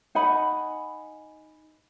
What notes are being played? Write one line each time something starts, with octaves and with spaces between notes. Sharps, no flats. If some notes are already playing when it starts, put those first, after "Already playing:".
D#4 F#5 G#5 B5